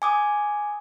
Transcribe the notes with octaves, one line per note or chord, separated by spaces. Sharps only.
G#5 D6 D#6